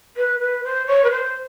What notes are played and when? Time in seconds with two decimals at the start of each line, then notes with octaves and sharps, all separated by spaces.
0.16 B4
0.39 B4
0.63 C5
0.86 C#5
1.03 B4
1.10 C5